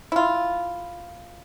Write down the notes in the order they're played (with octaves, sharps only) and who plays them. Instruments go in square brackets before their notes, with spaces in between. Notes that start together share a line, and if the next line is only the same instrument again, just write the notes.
[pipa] E4 F4